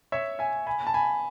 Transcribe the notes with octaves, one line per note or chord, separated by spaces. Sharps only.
C#5 E5
E5 G#5
G#5 B5
A5
G#5 B5